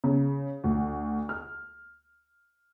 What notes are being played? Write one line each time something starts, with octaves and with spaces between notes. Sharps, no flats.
C#3
D2
F6